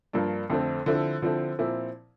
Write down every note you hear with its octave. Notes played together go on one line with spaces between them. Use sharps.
G2 F3 A#3 D4
F2 D3 A3 C4
D3 F3 C4 E4
D3 F3 C4 E4
A#2 F3 C4 E4